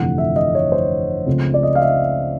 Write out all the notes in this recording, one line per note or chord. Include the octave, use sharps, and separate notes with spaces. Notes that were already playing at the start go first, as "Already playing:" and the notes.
Already playing: G1 F2 C3 E3 A3 F#5
E5
D#5
C#5
C5
C#2 C#3 F3 A3 C4
D5
D#5
F5
E5